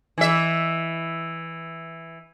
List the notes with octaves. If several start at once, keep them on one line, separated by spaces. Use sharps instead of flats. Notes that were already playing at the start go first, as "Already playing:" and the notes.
E3 E5